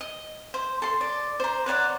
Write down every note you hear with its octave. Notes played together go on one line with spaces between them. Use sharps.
D#5
C5
A4 C6
D5
C5 A#5
B4 C#5 D5 F#5